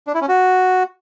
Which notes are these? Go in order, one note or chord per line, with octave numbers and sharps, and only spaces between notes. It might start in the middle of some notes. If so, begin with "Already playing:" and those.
D4
E4
C#4
F#4